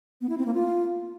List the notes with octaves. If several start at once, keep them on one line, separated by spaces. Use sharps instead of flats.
B3
E4
C4
A#3
F4